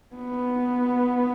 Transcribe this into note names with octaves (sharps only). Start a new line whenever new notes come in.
B3